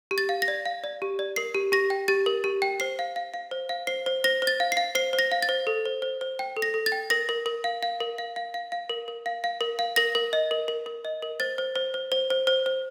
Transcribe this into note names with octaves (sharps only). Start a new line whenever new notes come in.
G4
A6
F5
A#6
D5
F5
D5
G4
D5
A#4 C7
G4
G4 A#6
G5
G4 A6
A#4
G4
G5
C5 C7
F5
F5
F5
C5
F5
C5 C7
C5
C5 A#6
C5
A6
F5
C7
F5
C5 C7
C5
A#6
F5
A6
C5
A4
C5
C5
C5
G5
A4
A#6
A4
A6
G5
A#4 A#6
A#4
A#4
F5
F5
A#4
F5
F5
F5
F5
A#4
A#4
F5
F5
A#4
F5
A#4 A#6
A#4
D#5
A#4
A#4
A#4
D#5
A#4
C5 A6
C5
C5
C5
C5
C5
C5
C5